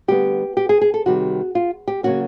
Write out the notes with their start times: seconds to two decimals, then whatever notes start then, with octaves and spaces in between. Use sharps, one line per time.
0.08 D3 G3 B3 G4
0.57 G4
0.69 G#4
0.81 G#4
0.94 A4
1.06 C3 D#3 G3 F#4
1.55 F4
1.88 G4
2.03 C#3 F#3 A#3 C#4 F#4